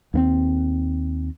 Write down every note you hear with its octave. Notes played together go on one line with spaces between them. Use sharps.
D#2 A#3 C4